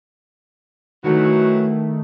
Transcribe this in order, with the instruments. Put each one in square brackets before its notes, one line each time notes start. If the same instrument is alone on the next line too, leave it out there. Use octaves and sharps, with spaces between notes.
[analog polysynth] D#3 A3 [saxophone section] E3 F#3 F#4